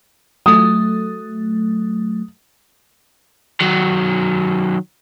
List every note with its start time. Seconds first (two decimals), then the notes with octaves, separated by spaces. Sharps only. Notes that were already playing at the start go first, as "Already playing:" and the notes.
0.46 F#3 A3 D#6
3.61 D#3 F#3